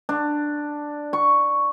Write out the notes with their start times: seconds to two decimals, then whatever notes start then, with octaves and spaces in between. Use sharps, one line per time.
0.09 D4
1.13 C#6